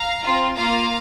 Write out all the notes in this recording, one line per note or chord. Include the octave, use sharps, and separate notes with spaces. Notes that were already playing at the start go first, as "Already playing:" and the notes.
Already playing: F5 A#5
C4 F4
A#3 F4 F5 A#5